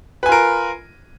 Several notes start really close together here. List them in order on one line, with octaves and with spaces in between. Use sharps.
B4 G#5 F4 A#4